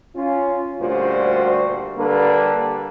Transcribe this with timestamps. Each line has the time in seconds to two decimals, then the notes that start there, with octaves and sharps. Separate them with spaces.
0.16 C#4 F4
0.81 D2 A#2 G3 F#4 C5
1.98 D3 G3 A#3 A4 B4